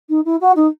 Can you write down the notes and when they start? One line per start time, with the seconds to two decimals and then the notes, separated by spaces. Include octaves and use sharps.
0.09 D#4
0.25 E4
0.41 F#4
0.56 D#4